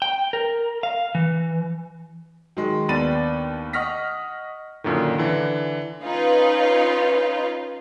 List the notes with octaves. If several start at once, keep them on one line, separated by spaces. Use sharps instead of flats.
G5
A#4
F5
E3
D#3 F#3 G#3
D#2 B3 D4 B5 A6 D#7
D#5 F#5 C#6 F6 A#6 B6
F#2 A#2 D3 D#3
D3 E3
C#4 D#4 F4 B4